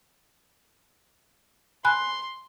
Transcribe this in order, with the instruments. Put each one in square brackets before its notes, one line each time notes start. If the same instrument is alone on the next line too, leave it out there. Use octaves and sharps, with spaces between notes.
[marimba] G#5 B5 F#6 [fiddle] C6